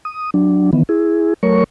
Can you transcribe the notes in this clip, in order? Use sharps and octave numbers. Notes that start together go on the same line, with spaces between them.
D#6
F#3 D4
D#3 E3 B3
E4 G#4
F#3 A3 A#4 C#5 C#6